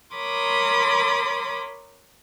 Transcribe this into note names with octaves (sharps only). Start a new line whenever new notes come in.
A#4 C#5 B5 C6 D6 D#6